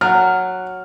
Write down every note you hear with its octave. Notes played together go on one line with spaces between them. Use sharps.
F#3 F#5 F6